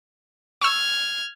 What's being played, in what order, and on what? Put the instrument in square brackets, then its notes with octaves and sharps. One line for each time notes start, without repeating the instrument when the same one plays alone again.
[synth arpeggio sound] C#6 E6 [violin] F6 G#6